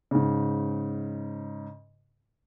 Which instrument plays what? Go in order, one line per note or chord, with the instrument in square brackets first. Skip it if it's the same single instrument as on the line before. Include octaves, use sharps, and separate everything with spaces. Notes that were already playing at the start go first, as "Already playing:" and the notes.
[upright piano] G#2 C#3